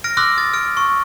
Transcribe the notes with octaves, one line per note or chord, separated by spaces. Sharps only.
F6 A#6 D7
C6 D6 E6 F#6 A#6
D#6 A6
F6 D7
C#6